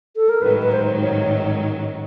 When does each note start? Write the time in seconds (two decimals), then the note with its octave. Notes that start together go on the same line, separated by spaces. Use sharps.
0.16 A4
0.29 A#4
0.42 A1 G#2 D#3 F#3 B4
0.62 B4
0.72 C5
1.01 C#5